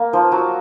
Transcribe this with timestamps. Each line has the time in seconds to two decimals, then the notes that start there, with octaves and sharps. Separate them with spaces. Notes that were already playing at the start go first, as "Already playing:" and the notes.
Already playing: A#3
0.13 F3
0.32 F#3